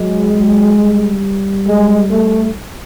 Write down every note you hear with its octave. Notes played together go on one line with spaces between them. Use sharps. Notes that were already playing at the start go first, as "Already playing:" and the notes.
Already playing: F#3 G#3
F#3
G3
G#3
A3